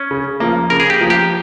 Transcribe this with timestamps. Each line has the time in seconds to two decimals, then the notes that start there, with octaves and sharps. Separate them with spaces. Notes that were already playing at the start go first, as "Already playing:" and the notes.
Already playing: C#4
0.11 C#3
0.40 F3 A#3
0.70 C#3 A#4
0.80 G#4
0.90 G4
1.01 F3 A#3
1.10 G4